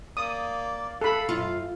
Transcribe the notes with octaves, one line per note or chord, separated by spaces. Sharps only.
A#3 D5 D#6
A4 F5 B5
F#2 F4